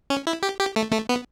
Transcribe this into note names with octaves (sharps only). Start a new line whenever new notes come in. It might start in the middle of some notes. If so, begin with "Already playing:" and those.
C#4
E4
G4
G4
A3
A3
B3